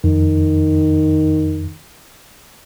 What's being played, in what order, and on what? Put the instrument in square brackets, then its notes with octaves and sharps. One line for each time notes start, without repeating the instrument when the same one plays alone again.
[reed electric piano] F2 [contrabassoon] D#3